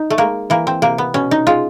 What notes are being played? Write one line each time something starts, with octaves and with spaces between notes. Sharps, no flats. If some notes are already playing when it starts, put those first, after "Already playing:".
Already playing: D#4
A3
G#3 A#3
E3 A#3
C4
C3 A#3
B3
B2 C#4
D#4
G#3 F4